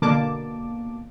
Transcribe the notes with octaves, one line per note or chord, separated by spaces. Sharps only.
B2 D3 A#3 A5 D6